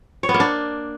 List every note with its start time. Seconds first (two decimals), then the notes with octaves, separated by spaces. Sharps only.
0.23 C#5
0.29 B3
0.34 A#3
0.40 D4